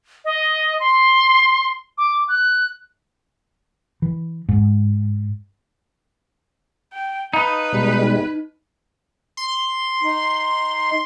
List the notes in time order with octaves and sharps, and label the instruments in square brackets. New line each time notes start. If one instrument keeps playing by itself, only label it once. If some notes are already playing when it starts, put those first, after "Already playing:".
[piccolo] D#5
C6
D6
F#6
[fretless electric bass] E3
G#2
[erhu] G5
[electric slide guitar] D#4 [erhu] B4 [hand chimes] F5 A5 B5
[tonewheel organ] B2 G3 G#3
[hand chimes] D#4
[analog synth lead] C6
[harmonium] D#4